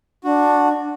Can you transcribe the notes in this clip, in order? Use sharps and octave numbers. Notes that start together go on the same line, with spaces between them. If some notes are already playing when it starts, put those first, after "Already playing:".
D4 F#4